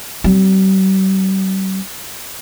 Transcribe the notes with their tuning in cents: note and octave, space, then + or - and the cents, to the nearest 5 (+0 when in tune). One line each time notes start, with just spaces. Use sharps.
G3 -45 C4 +0